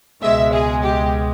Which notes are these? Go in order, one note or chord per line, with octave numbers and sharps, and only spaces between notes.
C#2 B2 G#3 E5
G#4
G4